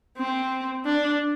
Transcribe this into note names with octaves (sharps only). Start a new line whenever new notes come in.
C4
D4